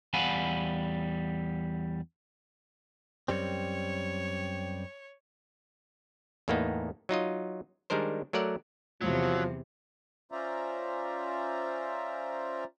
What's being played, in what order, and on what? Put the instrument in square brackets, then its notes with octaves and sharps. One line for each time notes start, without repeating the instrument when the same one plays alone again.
[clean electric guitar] E2 G3 F5 F#5 G#5 B5
[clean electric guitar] F#2 G3 C4 [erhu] C#5
[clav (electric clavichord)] E2 A2 A#3 B3 D#4
F#3 D#4 F4 D#5
D#3 G3 G#3 D4 A#4 C5
F#3 A3 A#4 D5 F#5
[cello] E2 C3 [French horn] F3 [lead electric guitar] F#3
[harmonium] C#4 F4 C5 D5 E5 A#5